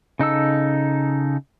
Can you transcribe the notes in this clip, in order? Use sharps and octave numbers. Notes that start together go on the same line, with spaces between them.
C#3 D#4 A4 E6